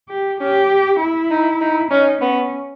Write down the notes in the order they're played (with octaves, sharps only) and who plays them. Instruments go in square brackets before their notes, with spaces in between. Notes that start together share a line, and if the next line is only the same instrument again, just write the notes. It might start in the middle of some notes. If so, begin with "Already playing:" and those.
[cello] G4
[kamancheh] C#4 [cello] G4
[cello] E4
[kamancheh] D#4
D#4
[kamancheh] C#4 [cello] D#4
[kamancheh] B3 [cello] C#4